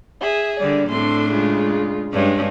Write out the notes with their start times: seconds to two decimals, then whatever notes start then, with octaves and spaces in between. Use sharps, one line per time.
0.21 G#4 E5
0.59 D3 G3 D5
0.89 A2 C4 D4 A4 C6
1.31 C#3 G#3 F4
2.13 G2 G#3 C#4 D4